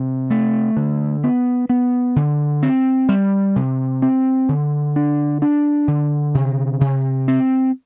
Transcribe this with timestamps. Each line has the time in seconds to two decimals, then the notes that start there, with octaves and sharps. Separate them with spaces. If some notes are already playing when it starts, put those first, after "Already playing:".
Already playing: C3
0.30 A3
0.77 D3
1.24 B3
1.69 B3
2.16 D3
2.63 C4
3.09 G3
3.56 C3
4.02 C4
4.49 D3
4.96 D4
5.42 D4
5.88 D3
6.35 C3
6.81 C3
7.28 C4